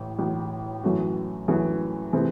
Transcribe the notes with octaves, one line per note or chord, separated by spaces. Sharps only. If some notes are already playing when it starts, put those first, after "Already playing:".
Already playing: A1 A2
A1 A2 F#3
F#2 E3 A3 C#4 F#4
F#2 E3 A3 C#4 F#4
C3 E3 A3 C4